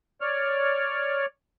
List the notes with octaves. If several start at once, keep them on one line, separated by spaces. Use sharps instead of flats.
C#5 D5 F6